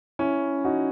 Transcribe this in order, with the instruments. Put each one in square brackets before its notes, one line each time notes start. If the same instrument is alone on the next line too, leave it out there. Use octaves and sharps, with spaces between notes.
[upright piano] C#4 E4
D#4 F#4